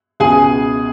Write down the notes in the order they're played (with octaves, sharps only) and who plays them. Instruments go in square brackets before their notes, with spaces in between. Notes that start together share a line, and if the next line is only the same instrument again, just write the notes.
[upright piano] C#2 B2 G#4 G#5